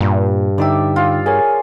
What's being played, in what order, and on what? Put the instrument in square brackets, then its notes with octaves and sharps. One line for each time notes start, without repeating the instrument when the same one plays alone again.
[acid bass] G2 [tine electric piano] A#2
[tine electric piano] D3 D#4 G5 [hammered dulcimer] D5 E5
[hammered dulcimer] F4
[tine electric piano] G#4 A#4 C#5 [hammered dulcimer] G#5